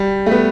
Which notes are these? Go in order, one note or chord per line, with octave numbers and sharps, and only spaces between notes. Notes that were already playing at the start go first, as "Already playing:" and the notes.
Already playing: G3
A3
B3